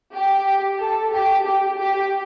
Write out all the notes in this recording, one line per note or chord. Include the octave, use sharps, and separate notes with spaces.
G4
A4
G4
G4
G4